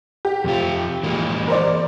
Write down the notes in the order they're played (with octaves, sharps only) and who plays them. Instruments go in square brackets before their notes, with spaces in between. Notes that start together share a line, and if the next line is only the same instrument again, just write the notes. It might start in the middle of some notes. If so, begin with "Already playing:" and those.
[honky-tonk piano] G4
[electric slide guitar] F2 C3 F4
E3 G#3 A#3
[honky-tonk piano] A#4 C5 D5